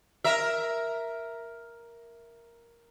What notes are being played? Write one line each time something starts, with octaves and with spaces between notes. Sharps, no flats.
A#4 E5